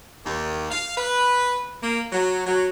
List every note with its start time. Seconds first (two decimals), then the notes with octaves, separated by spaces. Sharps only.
0.25 D#2
0.71 F5
0.97 B4
1.81 A#3
2.12 F#3
2.46 F#3